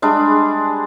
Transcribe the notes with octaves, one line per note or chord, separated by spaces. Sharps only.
G3 G#3 D4